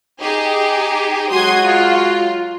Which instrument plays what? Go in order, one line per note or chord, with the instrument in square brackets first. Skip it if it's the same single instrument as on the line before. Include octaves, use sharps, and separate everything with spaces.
[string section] D#4 G4 G#4
[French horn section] F#3 G#3 F#4 [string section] C6 D#6 G#6
[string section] F4